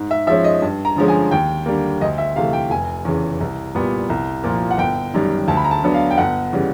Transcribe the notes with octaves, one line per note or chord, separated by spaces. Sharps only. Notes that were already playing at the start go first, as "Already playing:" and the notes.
Already playing: G#2
E5
F3 G#3 C#4 E5
D#5
G2
A#5
D3 F3 G#3 C#4
G#5
D#2 G5
D3 G3 A#3
D2 D#5
E5
C3 E3 A3 F5
G5
F1 G#5
E2 C#3 E3
C2
A#2 G3 B3
C2
A#2 F3 A#3
F#5
G1 G5
F#2 D#3 G3
D2 A5
B5
A#5
A5
D3 F#3 B3 D4
F5
G5
G1 F#5
C#3 E3 G3